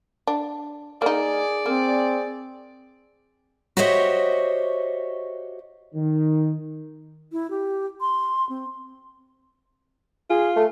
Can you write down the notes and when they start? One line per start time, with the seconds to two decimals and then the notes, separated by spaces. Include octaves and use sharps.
0.27 D4
1.02 A#3 D#4 G#4 D5
1.66 A#3 C4
3.77 F#4 G4 C5 C#5 D#5 E5
5.95 D#3
7.32 E4
7.50 G4
8.01 C6
8.49 C4
10.30 F4 G#4
10.56 A3